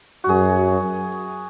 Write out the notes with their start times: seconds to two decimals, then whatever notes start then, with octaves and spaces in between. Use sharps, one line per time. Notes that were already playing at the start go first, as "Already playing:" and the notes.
0.24 F#2 F#4 G#4